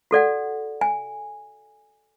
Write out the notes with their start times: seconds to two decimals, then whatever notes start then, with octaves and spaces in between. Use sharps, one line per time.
0.11 F#4 A4 D5 F#5
0.81 G#5